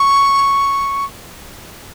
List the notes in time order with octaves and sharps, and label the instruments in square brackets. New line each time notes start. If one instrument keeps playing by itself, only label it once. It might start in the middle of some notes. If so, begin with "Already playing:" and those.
Already playing: [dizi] C#6